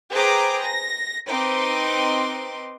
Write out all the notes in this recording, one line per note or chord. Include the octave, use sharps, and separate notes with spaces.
G#4 B4 C5 G5 A#5 D6
A#6
C4 D#4 B4 C6 D6